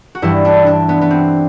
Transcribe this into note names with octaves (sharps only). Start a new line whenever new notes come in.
F#4
G2 E3 G3 E4
D4
D4
B3
B3
C4